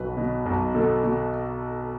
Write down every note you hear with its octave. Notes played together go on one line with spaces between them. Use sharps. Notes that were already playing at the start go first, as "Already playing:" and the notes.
Already playing: B1 F#3 B4
B2
B1
B2 A4
B2